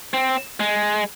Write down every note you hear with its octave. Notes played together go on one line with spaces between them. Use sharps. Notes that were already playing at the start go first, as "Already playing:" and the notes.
C4
G#3